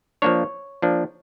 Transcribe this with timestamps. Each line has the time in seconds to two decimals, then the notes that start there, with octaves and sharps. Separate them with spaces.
0.22 F3 A#3 D4 C#5
0.82 F3 A#3 D4